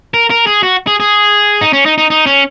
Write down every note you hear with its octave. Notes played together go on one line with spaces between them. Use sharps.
A#4
A#4
G#4
F#4
G#4
G#4
D#4
C#4
D#4
D#4
D#4
C#4